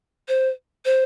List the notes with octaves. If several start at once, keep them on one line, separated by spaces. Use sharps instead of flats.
C5
C5